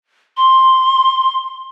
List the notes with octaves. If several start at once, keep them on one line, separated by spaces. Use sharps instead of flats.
C6